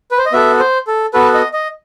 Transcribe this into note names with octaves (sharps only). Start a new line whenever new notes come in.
B4
C5
D#5
B3 F#4 A4 E5
C5
A4
B3 F#4 A4 B4
D#5
D#5